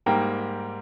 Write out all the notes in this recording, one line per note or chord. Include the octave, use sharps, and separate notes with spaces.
G#2 G3 A#3 G5 A#5